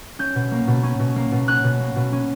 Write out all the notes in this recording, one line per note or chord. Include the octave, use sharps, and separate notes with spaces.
C#4 G6
B2
A#3
B2
C#4
B2
A#3
B2
C#4 F#6
B2
A#3
B2
C#4